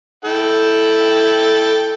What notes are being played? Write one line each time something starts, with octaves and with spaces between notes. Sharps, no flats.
E4 A4 G5